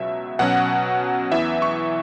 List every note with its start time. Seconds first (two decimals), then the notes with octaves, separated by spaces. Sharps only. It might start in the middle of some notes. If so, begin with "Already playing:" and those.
Already playing: C#2 B2 F#3 E5
0.39 B2 F#3 C#4 F#5
1.31 E2 E3 B3 E5
1.62 C#6